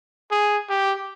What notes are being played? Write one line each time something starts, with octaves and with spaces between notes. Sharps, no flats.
G#4
G4